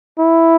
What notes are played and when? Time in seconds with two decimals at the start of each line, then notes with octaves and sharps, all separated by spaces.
0.19 E4